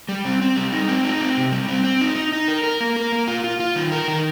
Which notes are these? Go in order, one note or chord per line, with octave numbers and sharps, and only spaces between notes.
G3
C4
C4
G3
D#4
C4
D#4
C4
C3
G3
C4
C4
D#4
D#4
D#4
A#4
A#4
A#3
A#4
A#3
F4
F4
F4
D#3
A#4
D#3